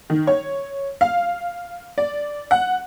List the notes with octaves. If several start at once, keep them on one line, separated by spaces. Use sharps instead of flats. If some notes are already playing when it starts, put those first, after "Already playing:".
D#3
C#5
F5
D5
F#5